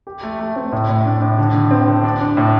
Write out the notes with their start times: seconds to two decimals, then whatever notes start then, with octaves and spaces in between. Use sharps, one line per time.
0.07 G4
0.23 A3
0.39 A3
0.56 C4
0.72 A2
0.89 A2
1.05 D4
1.22 A2
1.38 D3
1.54 D3
1.71 C4
1.88 D3
2.04 D4
2.21 D4
2.37 A2